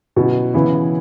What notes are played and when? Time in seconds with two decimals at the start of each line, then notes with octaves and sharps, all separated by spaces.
0.16 B2 F#3 C#4 E4
0.54 C#3 E3 B3 E4